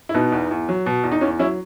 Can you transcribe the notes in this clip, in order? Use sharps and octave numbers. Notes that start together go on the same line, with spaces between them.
E4
B2 B3 D#4
E2
E2
F#3
B2
E2
D#4
E2 C#4
F#3 C#4 E4